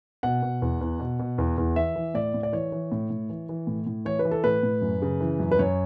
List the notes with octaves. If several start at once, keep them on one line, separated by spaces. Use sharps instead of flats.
B2 F#5
B2
E2
E2
B2
B2
E2
E2
E3 E5
E3
A2 D5
A2
D5
E3 C#5
E3
A2
A2
E3
E3
A2
A2
E3 C#5
B4
E3
A4
A2 B4
A2
F#2
C#3
E3
F#2
B4
F#2 C#5